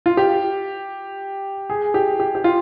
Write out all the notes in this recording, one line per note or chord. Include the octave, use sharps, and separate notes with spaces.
F4
G4
G#4
G4
G4
G4
F4